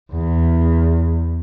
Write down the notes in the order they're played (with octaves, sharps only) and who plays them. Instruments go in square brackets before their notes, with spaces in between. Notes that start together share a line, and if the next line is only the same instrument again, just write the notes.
[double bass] E2